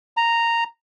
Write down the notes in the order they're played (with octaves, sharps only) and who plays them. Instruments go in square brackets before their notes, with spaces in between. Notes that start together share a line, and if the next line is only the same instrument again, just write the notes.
[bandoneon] A#5